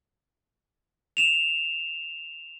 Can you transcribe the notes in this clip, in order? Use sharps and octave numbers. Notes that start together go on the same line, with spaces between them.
E7 F7